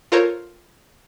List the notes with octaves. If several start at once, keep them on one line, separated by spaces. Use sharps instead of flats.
F4 A4 A#4 C5 C#5